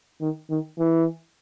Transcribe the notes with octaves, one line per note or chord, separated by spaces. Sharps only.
D#3
D#3
E3